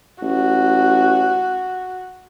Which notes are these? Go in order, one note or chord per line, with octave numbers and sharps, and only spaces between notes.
A1 F#4